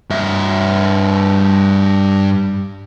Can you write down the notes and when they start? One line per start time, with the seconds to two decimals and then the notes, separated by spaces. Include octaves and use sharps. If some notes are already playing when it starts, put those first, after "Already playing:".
0.10 G2 E5